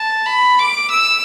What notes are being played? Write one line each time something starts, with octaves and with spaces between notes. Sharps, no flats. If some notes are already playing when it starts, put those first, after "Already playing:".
Already playing: A5
B5
D6
E6